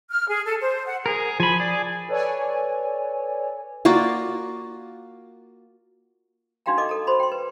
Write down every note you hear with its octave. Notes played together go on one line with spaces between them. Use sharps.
F6
G#4
A4
C5
F#5
G#4 A#4
F3 G#5 B5
G#4 D5
A4 B4 C#5 D5 G#5
A#3 F4 F#4 D5
D4 D#4 F#4 F5 G5 A#5
D#4 A4 D#5 D6
A4 A#5
F#4 C5 B5
G5 C6
B4